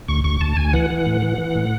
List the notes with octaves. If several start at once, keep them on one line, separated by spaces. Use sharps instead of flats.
D2 C#6
D2 C#6
D2 A5
D2 G#5
E3 F#5
E3
A2
E3
E3
A2